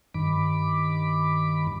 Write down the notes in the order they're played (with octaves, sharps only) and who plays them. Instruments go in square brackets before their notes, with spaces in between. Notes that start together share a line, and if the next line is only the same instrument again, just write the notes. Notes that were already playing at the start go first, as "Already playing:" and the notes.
[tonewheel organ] G2 D#3 B5 D6